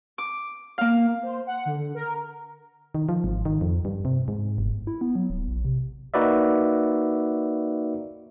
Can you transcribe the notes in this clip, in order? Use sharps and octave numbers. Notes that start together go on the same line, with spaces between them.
D6
A#3 F5
C5
F#5
D3
A#4
D#3
F3
G#1
D#3
F2
G2
C3
G#2
G1
E4
B3
F#3
D1
A#1
C3
A#3 D#4 F#4 B4 D5 E5